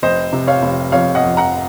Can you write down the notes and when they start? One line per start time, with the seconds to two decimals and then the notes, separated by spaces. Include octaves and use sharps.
0.03 F1 C5 D#5
0.33 C3
0.47 C#5 F5
0.62 F1
0.92 F2 C#5 F5
1.15 D#5 F#5
1.23 F2
1.37 F#5 A#5